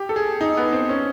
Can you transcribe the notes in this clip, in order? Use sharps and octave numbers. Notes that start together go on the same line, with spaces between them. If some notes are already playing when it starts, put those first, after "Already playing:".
Already playing: G4
A4
G#4
D#4
B3
C4
C#4